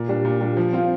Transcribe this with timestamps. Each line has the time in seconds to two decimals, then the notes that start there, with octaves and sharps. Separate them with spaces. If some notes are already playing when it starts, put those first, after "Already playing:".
Already playing: A#2
0.09 G3 D4
0.25 A#2
0.41 G3 D4
0.57 F3
0.73 C4 F4